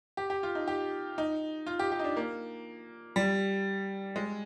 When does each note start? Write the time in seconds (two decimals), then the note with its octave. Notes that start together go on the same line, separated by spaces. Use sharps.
0.17 G4
0.30 G4
0.43 F4
0.55 D#4
0.68 G4
1.18 D#4
1.67 F4
1.79 G4
1.92 G4
1.99 D#4
2.04 D4
2.17 A#3
3.16 G3
4.16 G#3